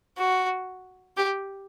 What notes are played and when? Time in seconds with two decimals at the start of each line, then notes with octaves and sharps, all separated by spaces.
0.18 F#4
1.17 G4